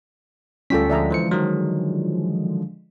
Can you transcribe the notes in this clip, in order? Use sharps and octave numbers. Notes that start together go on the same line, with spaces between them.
D2 G3 C#4 F4 A4 G5 B6
D3 F3 G#3 D5 E5 A#5
E3 C5 C#7
D#3 F#3